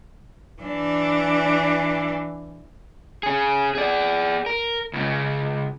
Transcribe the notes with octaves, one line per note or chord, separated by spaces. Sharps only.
E3 D4
C#4 G#4
G#4 D5
A#4
C#2 C#3